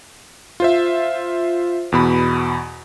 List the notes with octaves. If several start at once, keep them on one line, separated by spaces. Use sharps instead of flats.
F4 C5 E5
E2 B2 B5